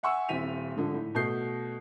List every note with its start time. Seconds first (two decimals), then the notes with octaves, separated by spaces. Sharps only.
0.03 E5 F#5 G#5 C#6 E6
0.29 D#1 C4 E4 B6 D#7 F7
0.76 G#2 D3 F3
0.94 A2
1.15 B2 A3 G6 C7